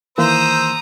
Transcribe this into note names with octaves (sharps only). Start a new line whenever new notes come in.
D#3 E3 A#3 C5 A#5 D#6 E6